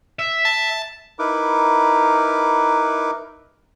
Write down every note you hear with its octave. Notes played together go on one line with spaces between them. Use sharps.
E5
A5
D#4 E4 A#4 B4 D6